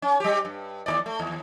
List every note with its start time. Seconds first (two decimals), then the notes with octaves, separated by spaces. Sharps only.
0.02 C#4
0.20 G3 G4
0.45 G2
0.86 D#2 A2 D5
1.06 A3
1.20 D#2